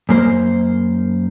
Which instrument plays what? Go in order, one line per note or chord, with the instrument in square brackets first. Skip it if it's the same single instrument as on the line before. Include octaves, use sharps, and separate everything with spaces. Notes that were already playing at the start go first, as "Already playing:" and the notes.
[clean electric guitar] F#2 A#3 C5